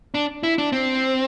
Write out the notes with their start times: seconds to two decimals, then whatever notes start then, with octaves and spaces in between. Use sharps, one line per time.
0.14 D4
0.43 E4
0.58 D4
0.72 C4